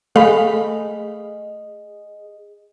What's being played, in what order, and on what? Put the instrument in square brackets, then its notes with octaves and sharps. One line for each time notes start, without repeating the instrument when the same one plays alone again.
[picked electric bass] A3 [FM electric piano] G#4 D#5 [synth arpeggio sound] F5 B5